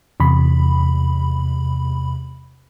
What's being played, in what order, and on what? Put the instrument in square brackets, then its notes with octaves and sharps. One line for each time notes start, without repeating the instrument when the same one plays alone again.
[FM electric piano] E2 C3 B5